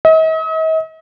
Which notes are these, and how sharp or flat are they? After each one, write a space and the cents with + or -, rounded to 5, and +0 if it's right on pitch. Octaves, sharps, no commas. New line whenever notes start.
D#5 +45